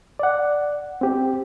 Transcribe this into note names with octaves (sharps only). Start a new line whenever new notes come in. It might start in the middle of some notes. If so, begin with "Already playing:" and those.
D5 F#5
C4 G4